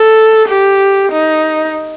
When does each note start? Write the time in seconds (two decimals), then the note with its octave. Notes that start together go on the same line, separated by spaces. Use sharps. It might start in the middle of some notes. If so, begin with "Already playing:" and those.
Already playing: A4
0.49 G4
1.11 D#4